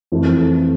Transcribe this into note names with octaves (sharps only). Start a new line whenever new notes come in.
F2 E3 A3